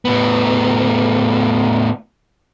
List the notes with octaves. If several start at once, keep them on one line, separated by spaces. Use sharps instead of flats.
A2 B3